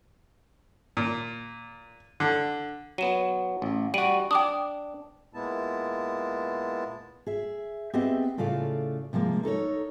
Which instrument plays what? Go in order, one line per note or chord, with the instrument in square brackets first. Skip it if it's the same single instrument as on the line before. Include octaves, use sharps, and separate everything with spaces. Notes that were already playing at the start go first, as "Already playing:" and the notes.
[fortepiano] A#2
D3
[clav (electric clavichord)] F#3 B3 [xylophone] D#7 E7
[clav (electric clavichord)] A1
[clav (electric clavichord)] G3 F#4 [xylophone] D7 D#7 F#7
[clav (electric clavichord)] D4 [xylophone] G5 D6 D#6
[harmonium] A#2 G#3 B3 E4 A5
[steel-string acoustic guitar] G#4 E5
B3 C4 G4 G#4 D#5 E5
A2 C#3 A3 F4 D5 F5
C3 F3 G#3 A#3
D#4 A4 A#4 C#5